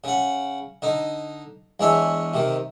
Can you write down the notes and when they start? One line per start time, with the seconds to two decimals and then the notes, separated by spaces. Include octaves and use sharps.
0.04 C#3 F#5
0.82 D3 D#4
1.80 E2 G#3 D4 C#5 E5 G#5
2.34 C3 D#3